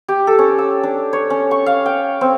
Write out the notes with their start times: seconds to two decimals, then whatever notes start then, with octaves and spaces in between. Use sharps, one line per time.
0.08 G4
0.27 A4
0.39 C#4
0.58 E6
0.83 D4
1.13 C#5
1.30 C#4
1.51 C#6
1.66 F5
1.86 G5
2.21 C4